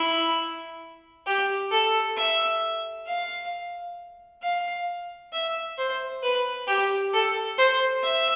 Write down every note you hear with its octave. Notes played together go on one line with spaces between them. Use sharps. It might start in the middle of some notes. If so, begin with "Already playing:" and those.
Already playing: E4
G4
A4
E5
F5
F5
E5
C5
B4
G4
A4
C5
E5